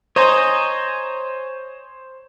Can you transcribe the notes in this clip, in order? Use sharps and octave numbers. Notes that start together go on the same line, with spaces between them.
C5 C#5 D#5 G#5 A#5